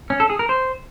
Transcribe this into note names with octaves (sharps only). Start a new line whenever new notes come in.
C#4
A4
G#4
A#4
C5